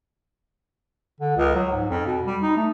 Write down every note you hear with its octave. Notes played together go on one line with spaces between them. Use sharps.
D3
C#2
F#3
G#2
F2
B2
G3
D#4
A3